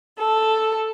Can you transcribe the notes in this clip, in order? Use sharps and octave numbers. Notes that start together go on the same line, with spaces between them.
A4